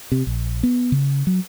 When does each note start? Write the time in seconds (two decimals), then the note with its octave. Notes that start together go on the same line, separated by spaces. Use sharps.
0.12 C3
0.27 A#1
0.63 B3
0.92 C#3
1.27 F#3